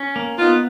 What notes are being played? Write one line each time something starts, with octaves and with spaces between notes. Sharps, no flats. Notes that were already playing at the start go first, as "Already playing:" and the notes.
Already playing: C#4
A#3
B3 D#4 F4